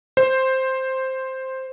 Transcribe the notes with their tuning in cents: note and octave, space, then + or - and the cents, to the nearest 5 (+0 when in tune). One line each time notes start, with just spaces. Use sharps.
C5 +5